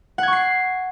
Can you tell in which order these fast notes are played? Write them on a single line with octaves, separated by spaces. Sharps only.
F#5 G#6 C#6 C7